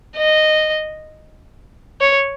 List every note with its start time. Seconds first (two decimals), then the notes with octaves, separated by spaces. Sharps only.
0.17 D#5
2.01 C#5